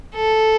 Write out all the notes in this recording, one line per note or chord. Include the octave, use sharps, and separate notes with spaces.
A4